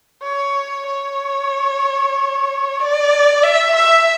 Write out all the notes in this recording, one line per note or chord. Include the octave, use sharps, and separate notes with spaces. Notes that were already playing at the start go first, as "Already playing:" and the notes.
C#5
C#5
D5
E5
E5